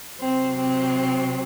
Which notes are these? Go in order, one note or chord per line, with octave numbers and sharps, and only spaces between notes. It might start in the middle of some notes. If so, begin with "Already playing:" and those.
C3 F#3 C4
C4